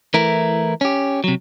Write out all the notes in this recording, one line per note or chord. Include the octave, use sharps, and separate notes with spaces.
E3 A3 E4 A#4
C#4 G4
C3 F#3